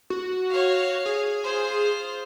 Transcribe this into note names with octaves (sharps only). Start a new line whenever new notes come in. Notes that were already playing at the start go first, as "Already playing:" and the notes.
F#4
C#5 F5
G#4
F4 C5